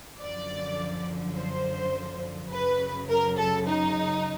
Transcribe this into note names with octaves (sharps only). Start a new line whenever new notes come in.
F#2 D3 F3 D5
C5
F#2 C#3 F#3 B4
A#4
A4
D#4